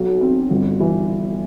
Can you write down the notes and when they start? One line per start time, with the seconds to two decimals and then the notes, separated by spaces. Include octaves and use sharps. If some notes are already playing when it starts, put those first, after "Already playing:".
Already playing: B1 F#3
0.21 C4
0.51 G1
0.80 E3